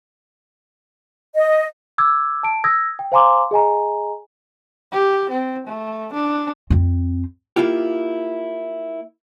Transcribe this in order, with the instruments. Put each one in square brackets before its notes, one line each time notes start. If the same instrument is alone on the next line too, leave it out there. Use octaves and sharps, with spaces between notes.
[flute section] D#5
[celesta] D6 E6 G#6
A5 D7
D#6 E6 G#6 A#6
G5
C5 F5 G#5 A#5 C6 D6
G#4 D#5 G#5 A#5
[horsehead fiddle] G4
C4
A3
D4
[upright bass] F2 C4
[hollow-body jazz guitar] A#3 E4 F4 G4